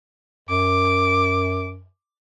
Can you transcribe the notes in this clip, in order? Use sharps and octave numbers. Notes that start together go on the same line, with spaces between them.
F#2 D6